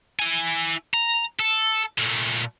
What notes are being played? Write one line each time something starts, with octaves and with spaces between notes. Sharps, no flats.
E4 G#5
A#5
A4
A#2 A3